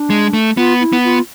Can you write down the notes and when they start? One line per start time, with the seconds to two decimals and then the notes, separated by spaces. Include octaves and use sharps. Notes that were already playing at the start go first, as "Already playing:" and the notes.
Already playing: D4
0.10 G#3
0.33 A3
0.57 B3 F4
0.80 E4
0.93 B3
1.04 F4